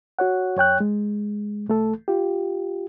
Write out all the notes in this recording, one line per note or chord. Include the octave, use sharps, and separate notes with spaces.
F#4 C#5 F#5
F#2 C#5 G5 F#6
G#3
C2 A3 A4
F4 G4